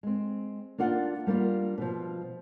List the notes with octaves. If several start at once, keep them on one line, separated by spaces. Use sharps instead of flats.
G#3 C4
A#3 D4 F4 F#5
G3 A#3 D4 F4
B2 F3